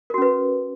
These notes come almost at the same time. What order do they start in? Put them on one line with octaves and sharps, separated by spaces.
A#4 F#4 C#4 B4